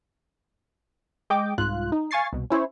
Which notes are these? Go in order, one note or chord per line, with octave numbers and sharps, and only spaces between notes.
G#3 D#5 G5 D6
C2 G#2 F4 F#6
D#4
F5 G#5 C#6 A6 C7
C2 B2
C#4 E4 C5 C#5